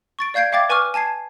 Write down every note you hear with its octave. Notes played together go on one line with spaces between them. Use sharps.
C#6 A6 D7
D5 F5 G6 G#6 C7 D7
E5 F5 G5 D6 G#6 A6
B4 G#5 C#6 D6 F6
G#5 A5 G#6 C7